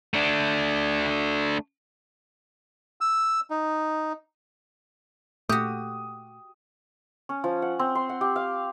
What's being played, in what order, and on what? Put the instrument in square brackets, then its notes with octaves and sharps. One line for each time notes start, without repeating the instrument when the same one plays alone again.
[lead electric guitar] A3 D4
[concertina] E6
D#4
[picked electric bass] A#2 A3 [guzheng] F#4 G4 [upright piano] D#6
[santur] C#4
F3
F#5
C4
C6
F#5
G4
F5